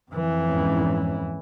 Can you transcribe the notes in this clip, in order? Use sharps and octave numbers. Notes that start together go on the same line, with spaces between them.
F2 E3
E2 G#2 C#4